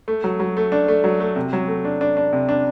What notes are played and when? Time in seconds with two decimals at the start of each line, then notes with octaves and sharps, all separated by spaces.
0.08 A3
0.24 F#3
0.40 F#3
0.57 A3
0.72 D4
0.88 A3
1.04 F#3
1.20 A3
1.36 C3
1.53 F#3
1.68 A3
1.85 D4
2.01 D4
2.17 D4
2.33 C3
2.49 D4